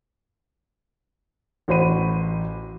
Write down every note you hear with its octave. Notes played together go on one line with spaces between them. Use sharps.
A1 F#4 C5 B5 D#7